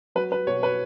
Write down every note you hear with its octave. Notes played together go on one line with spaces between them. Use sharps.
F#3 B4
B4
B2 C#5
B4